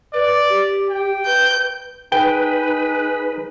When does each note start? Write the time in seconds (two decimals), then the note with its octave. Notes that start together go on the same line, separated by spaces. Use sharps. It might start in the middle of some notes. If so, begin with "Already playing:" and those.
0.14 B4 D5
0.49 G4
0.91 G5
1.26 B4 G6
2.12 D#4 G#4 B4 G5